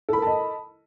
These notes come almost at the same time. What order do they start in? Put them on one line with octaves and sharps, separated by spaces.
A4 B5 A#4 A5 D#5